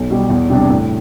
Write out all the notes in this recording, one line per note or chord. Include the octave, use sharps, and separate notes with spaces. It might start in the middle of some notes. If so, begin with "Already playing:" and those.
Already playing: B1
B2 G3
E2
C3 G3 D4
A2